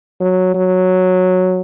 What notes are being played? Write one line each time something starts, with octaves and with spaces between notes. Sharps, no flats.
F#3
F#3